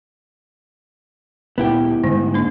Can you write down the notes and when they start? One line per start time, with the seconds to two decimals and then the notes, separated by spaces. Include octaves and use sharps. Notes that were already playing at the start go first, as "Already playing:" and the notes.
1.58 D2 A#2 B3 E4 G4
2.04 G#2 D3 G3 A3
2.34 A#3 D4